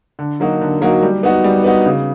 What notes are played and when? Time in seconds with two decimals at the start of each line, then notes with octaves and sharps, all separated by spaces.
0.19 D3
0.40 F#3 A#3 D#4 F#4
0.61 D3
0.81 F#3 A#3 D#4 F#4
1.03 G3
1.23 B3 D#4 F#4
1.44 G3
1.64 B3 D#4 F#4
1.86 C#3